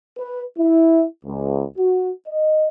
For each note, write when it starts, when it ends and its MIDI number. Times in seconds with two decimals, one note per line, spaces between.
0.18 0.43 71
0.59 1.04 64
1.25 1.64 37
1.78 2.10 66
2.28 2.67 75